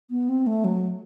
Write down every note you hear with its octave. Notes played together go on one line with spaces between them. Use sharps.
B3
C4
A3
F#3